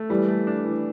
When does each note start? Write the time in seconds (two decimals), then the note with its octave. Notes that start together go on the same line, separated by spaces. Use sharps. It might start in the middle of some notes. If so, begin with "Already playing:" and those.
Already playing: A3
0.09 E3 G3
0.28 A3
0.47 D4
0.65 E3